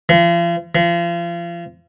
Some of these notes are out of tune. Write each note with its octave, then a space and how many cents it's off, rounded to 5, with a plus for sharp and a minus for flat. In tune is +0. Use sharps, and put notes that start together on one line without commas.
F3 -40
F3 -35